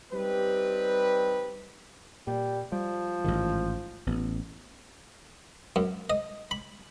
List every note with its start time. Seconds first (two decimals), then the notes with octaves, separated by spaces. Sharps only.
0.12 G3 C4 D#4 G4 B4
2.27 A#2 G3
2.72 F3 G3
3.24 A1 G#2 D#3
4.07 A1 B3
5.76 F#2
6.10 D#5
6.51 B5